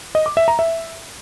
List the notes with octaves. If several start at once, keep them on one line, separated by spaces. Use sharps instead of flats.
D#5
D6
E5
A#5
E5